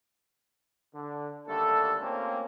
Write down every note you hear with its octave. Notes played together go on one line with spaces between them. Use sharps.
D3
D#2 D3 G3 A3 A4
A3 A#3 C4 C#4 F4 G4